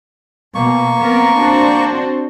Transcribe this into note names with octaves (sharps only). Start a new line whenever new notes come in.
B2 A#3 C#6
B3 C4 A#4
C4 D4 F#4